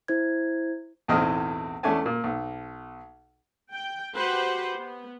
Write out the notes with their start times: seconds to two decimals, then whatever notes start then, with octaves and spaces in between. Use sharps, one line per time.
0.08 E4 C5 G#6
1.08 B1 E2 A2 C4 D#5 F6
1.83 E2 A3 C#4 D4 G#5 A5
2.06 A#2
2.24 B1
3.73 G5
4.15 F#4 G4 B4 C5 F#5
4.75 B3